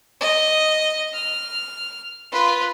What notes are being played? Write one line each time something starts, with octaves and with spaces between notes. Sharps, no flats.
D#5
F6
F4 B4